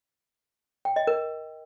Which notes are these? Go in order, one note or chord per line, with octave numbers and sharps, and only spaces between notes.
G5
D#5
A#4